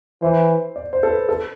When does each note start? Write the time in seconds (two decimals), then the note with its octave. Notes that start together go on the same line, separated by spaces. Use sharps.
0.22 E3 C5
0.76 D5
0.93 C5
1.03 A4
1.10 B4
1.29 A4